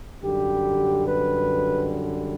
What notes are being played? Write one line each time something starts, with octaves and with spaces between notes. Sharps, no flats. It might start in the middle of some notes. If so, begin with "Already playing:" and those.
F#2 D3 G3 G4
B4